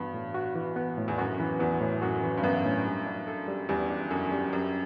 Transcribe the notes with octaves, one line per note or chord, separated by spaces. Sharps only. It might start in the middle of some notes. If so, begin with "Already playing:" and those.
Already playing: G2 E3 B3 F#4
A2
F#4
E3
B3
A2
E2
F#2 F#4
E3
E2 B3
A2
F#2 F#4
E3
G2
F#2 B3
A2
G3
D4
A4
G3
E2 G3
D4
F#2 A4
G3
F#2 G3